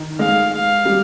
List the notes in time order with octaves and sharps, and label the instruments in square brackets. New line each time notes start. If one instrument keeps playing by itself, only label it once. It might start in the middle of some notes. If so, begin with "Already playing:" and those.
Already playing: [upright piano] D#3
[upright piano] G#3 [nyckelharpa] F5
[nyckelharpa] F5
[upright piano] G3